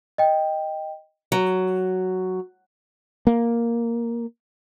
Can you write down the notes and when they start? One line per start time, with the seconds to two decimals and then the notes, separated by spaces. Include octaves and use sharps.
0.18 D#5 G5
1.32 F#3
3.27 A#3